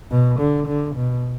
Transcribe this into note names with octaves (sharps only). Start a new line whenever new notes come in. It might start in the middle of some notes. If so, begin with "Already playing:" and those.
B2
D3
D3
B2